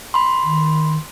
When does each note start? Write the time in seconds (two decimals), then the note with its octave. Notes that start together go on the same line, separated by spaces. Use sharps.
0.14 B5 C6
0.43 D#3